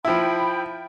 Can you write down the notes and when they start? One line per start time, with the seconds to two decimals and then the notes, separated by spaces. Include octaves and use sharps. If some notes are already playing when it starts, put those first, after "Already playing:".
0.05 F3 E4 G5 B5